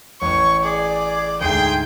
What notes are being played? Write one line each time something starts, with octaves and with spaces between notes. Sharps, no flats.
A1 C#5 C#6
G#4 D5
D2 G#2 G#4 G5 C6 D#6